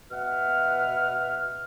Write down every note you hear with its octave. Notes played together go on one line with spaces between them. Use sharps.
B2 B4 E5 F#5 F6